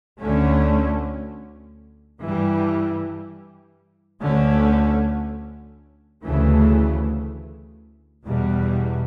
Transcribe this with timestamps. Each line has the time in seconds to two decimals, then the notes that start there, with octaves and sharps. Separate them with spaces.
0.19 D2 D3 A3 C#4
2.21 G2 E3 G3
4.22 D2 D3 A3 C#4
6.24 D2 C#3 E3 A3
8.26 E2 B2 G3